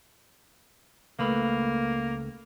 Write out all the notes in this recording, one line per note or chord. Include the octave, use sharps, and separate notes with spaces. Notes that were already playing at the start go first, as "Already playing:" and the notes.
C#2 A3 A#3 B4